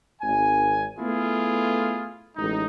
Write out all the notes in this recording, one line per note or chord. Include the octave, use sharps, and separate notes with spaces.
G#1 G#5
A3 B3 E4 F4 G#4
A1 G#3 D#4